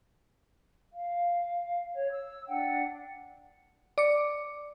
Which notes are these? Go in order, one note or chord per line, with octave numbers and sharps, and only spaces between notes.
F5
C#5
E6
D4 F#5 G5
D5 D6 C#7